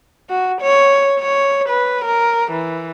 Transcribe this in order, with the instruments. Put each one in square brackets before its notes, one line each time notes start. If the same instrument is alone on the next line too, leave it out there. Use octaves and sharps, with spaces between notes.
[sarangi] F#4
C#5
C#5
B4
A#4
E3